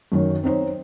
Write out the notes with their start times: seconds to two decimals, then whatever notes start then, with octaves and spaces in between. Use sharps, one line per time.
0.12 F#2 D#3 F#3
0.44 C4 D#4 C5 C#5